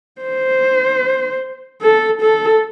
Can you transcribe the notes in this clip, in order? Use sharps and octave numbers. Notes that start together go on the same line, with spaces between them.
C5
A4
A4